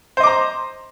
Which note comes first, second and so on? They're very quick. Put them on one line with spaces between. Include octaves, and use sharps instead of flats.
C5 D#5 D6 A#5